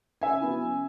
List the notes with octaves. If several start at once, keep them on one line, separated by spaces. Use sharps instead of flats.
C#3 E5 G#5
F#3 B3 E4
C#3